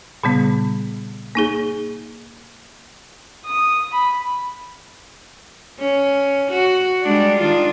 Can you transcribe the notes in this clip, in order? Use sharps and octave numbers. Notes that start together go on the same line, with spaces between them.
A#2 C#3 G3 B3
A#3 D#4 G#4
D#6
B5
C#4
F#4
G3 G#3 D4
D#3 D4 F4